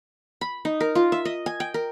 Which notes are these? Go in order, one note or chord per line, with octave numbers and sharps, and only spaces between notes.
B5
D#4
A#4
F4
E5
D#5
G#5
G5
A#4